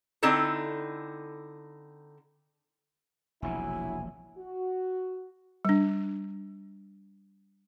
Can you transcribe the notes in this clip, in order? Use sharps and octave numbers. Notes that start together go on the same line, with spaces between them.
D3 C4 D#4 E4 A4
E1 A#1 C3 F#3 E4 G#5
F#4
G3 D4